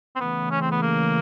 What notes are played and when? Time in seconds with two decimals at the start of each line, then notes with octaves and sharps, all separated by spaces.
0.16 C4
0.20 C#3 E3 A3 B3
0.51 C#4
0.61 C4
0.71 B3
0.82 A#3